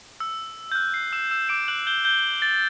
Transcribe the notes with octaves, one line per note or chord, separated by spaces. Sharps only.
E6
G6
F#6
C7
E6 E7
E6 E7
D6 D7
F#6 F#7
G6 G7
G6 G7
A6